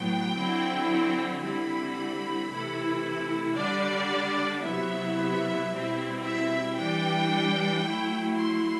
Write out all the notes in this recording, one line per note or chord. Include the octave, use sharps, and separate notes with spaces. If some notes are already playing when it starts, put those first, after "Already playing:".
Already playing: A2 F#3 B3 G5
D3 F#3 C4 E4
D3 G3 C4 E4 B5
C3 E3 A3 E4
D3 G3 D4 D5
C3 F#3 B3 E4 E5
B2 G3 C4 E4
E5
E3 G3 D4 G5
F#3 A3 E4
C6